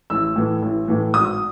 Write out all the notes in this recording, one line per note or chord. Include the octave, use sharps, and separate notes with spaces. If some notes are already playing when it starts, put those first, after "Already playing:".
A1 E6
A2 E3
A1
A2 E3
G#1 D#6